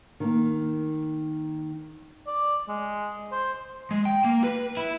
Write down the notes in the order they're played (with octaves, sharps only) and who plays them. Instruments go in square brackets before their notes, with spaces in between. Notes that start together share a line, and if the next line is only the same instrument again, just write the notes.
[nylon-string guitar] D#3 A#3
[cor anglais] D5
G#3
C5
[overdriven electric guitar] G#3
G5
A#3
B4
E4